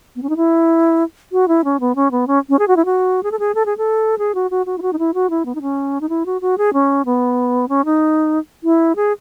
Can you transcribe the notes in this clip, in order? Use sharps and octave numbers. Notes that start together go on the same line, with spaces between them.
B3
C#4
D#4
E4
F#4
E4
C#4
B3
C#4
B3
C#4
C#4
G#4
F#4
E4
F#4
G#4
A4
G#4
A4
G#4
A4
G#4
F#4
F#4
F#4
E4
F#4
D#4
E4
F#4
E4
B3
D#4
C#4
D#4
E4
F#4
F#4
G#4
C#4
B3
C#4
D#4
E4
G#4